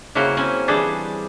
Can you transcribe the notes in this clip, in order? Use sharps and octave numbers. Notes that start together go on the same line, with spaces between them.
C#3 A#3 E4 F#4 C5
C4 C#4 G#5
E3 G3 D4 G#4 A4 C5